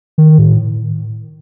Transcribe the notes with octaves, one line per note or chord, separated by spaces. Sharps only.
D#3
A2